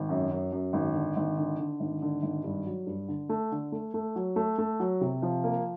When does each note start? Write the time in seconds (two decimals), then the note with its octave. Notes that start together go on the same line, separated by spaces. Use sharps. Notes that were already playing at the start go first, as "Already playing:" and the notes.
Already playing: G#1
0.09 F#2
0.31 F#2
0.52 F#2
0.73 G#1
0.95 D3
1.16 G#1
1.38 D3
1.59 D3
1.80 G#1
2.02 D3
2.22 G#1
2.44 G2
2.66 F#3
2.86 G2
3.08 D3
3.29 A3
3.52 D3
3.72 A3
3.94 A3
4.16 F#3
4.36 A3
4.58 A3
4.80 F#3
5.01 C3
5.22 F3
5.44 A#3